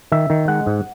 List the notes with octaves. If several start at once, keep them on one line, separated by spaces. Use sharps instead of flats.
D#3 E5
D#3
G#3 F#5
G#2